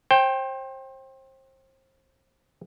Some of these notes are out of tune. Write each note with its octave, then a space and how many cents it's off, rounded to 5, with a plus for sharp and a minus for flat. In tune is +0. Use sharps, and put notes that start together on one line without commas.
C5 +30 G5 +0